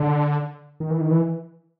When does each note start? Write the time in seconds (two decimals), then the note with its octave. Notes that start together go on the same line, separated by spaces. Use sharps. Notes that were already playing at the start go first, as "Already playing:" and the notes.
Already playing: D3
0.80 D#3
0.91 E3
1.01 D#3
1.11 E3